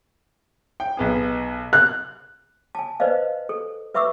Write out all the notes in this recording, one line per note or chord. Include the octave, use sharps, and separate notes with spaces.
G5
B1 B3 G#4
F#6
G#5 A5
B4 C5 D5 D#5 F5
A4
B4 E5 B5 C#6 D6 E6